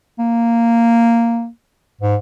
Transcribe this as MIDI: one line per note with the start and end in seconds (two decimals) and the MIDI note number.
0.19 1.48 58
2.01 2.16 44